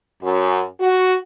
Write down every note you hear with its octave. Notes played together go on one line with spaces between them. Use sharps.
F#2
F#4